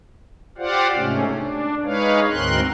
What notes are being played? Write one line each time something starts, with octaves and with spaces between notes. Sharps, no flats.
F4 G4 C5 D5 F5 F#5
G#2 C3 A3 C#4
D4
G#3 D#4 B4 C#5 F5
D2 G#2 C4 A#4 C6 F#6